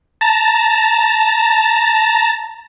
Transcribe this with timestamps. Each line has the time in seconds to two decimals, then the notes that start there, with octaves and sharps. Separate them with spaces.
0.21 A5 A#5